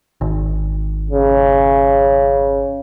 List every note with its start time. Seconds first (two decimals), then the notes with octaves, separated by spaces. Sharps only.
0.21 G#1
1.10 C#3